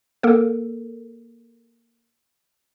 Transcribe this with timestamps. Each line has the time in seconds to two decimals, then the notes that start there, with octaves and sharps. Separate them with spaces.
0.23 A#3 A4 A#4